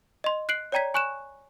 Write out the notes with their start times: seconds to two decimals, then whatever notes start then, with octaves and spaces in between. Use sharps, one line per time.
0.24 D#5 C6
0.49 F#6 C7 D7 F#7
0.72 C#5 D5 G5 A#5 G#6 B6
0.94 G#5 C#6 F#6 D7 E7